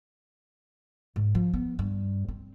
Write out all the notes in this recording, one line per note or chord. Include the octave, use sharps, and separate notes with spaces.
G#2
F3
B3
G2
C4